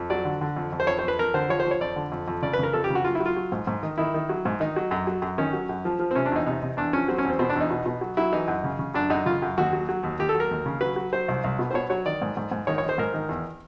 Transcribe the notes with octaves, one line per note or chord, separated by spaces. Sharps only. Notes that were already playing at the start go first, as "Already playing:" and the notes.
Already playing: F2
F#3 D5
D3
D3
F2
F2
C5
F2 C#5
C5
F2 B4
F2 A#4
D3 C5
F3 C#5
C5
F3
C#5
F2 D5
D3
F2
F2
C#3 D5
B4
C#3 A#4
F2 A4
G4
C#3
F#4
F#3 F4
E4
F#3
F4
F#3
G#2
G#2
D#3
D#3 E4
D#3
F#3
G#2
D#3 D#4
F#3
F#2
F#3
F#2
D#3 C#4
F#3
F#2
F3
F3
C4
C3 C#4
D4
E2 D#4
C3 D#4
C3
E2 D4
F3 C#4
F#3 C4
C#4
E2 C4
B2 C4
D4
E2 D#4
B2
B2
F#3
F#3 E4
E3 D#4
F#2
C#3
C#3
F#2 D4
F#2 D#4
C#3 F4
F#2
D#2 F#4
F#3
F#3
D#2
D#2 G4
A4
F#3
A#4
D#2
C#3
F#3 B4
F#3
F#3 C5
C2
C2
B2
C5
B2 C#5
F#3 C#5
D#3 D5
G#2
G#2
G#2
D#3 C#5
C#5
D#3
C5
G#2 A#4
D#3
E2